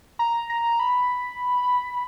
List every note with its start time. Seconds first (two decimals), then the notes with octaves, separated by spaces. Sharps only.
0.19 A#5
0.50 A#5
0.79 B5